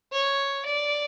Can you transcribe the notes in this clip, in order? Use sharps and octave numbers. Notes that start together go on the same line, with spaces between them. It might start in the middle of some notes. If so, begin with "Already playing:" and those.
C#5
D5